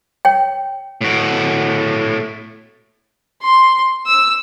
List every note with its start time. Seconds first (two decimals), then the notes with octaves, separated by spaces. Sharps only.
0.25 C#5 G5
1.01 A2 F#4
3.42 C6
4.06 E6